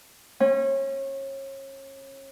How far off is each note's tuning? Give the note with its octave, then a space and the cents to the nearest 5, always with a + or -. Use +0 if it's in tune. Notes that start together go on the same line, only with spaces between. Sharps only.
C#4 -30